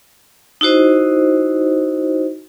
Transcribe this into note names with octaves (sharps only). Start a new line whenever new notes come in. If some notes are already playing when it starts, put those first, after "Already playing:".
D#4 E4 F#4 C5 D#5